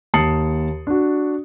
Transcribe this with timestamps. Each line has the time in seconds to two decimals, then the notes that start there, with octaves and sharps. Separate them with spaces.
0.14 D#2 A5 D#6 C7 C#7 F#7
0.87 D4 F#4